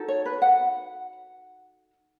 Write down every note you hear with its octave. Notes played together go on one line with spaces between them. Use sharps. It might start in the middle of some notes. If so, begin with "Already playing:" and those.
Already playing: D#4 F#4 A4
C#5
B4
F#5